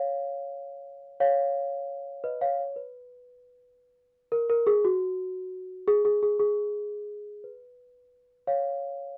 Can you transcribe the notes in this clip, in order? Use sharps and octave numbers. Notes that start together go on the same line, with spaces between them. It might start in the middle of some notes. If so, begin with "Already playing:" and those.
Already playing: C#5 F5
C#5 F5
B4 D#5
C#5 F5
C#5
B4
A#4
A#4
G#4
F#4
G#4
G#4
G#4
G#4
B4
C#5 F5